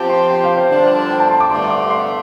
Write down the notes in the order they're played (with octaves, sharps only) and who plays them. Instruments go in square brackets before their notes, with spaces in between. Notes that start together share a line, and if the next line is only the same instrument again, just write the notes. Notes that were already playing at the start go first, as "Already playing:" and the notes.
Already playing: [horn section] F3 C4 G4 [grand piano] A5
[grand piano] C6
G5
F5
C5
[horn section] G2 D3 F3 D4
[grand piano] G5
A5
C6
D6
[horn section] G2 D3 A3 [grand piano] C6
[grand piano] D6
C6